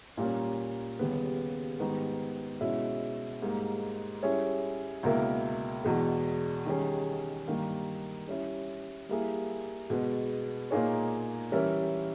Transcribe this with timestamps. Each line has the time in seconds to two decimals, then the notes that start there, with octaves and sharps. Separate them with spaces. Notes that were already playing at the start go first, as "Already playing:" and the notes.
0.17 A#2 G3 A#3 C#4
0.99 D#2 C#3 G3 B3
1.79 G#2 D#3 G3 B3 D#4
2.61 B2 G#3 C#4 E4
3.42 G#2 G3 A#3
4.23 G3 C#4 E4 G#4 C#5
5.03 C#2 B2 A#3 E4 A#4
5.84 E2 B2 G#3
6.66 D#3 G3 C#4 G#4
7.48 G2 D#3 A#3
8.28 G3 C#4 E4
9.09 G3 A#3 E4 G#4
9.90 B2 G#3 B3
10.71 A#2 A#3 D#4 G#4 C#5
11.52 E3 G3 C#4 E4 A#4